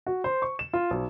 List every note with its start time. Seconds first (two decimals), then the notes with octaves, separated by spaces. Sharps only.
0.06 F#4
0.24 C5
0.42 C#6
0.59 E7
0.73 F4
0.91 B1